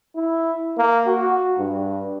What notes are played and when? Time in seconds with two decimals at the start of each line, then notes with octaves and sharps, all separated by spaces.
0.16 E4
0.78 A#3
1.07 F#4
1.59 G2